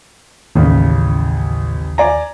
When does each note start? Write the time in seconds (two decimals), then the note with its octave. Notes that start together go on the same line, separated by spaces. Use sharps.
0.56 A1 D#2 A2 C#3
1.98 D5 G#5 A#5